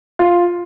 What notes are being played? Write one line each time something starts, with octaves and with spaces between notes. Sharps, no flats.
F4